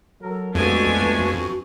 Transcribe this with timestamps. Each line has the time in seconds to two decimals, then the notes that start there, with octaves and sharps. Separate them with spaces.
0.21 F#3 A4 A#4
0.55 F2 G#3 A3 B3 D4 F#4 G#5